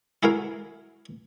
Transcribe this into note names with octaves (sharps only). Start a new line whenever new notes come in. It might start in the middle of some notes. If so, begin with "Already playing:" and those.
E4 F#4 G#4 A#4 F5